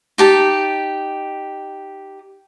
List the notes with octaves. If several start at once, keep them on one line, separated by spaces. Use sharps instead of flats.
D#4 G4 A5